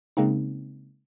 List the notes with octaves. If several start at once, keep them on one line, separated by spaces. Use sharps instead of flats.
C#3 G#3 A#3 C4 D#4